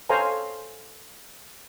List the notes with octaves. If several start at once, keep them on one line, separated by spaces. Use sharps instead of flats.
A4 C5 C#5 F5 G#5 A#5